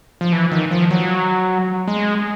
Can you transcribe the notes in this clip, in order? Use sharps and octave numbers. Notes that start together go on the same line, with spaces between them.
F3
E3
D#3
F3
F#3
G#3